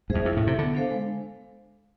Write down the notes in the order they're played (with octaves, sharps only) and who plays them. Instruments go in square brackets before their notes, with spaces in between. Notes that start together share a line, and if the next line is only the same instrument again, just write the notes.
[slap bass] F2 G#2 [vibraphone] G#4 C5 E5
[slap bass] F2 [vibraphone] E4
[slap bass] A2
[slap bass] C3 [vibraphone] A4 E5
[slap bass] D3 [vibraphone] B3
[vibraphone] D4 A4 C5 F5
G#3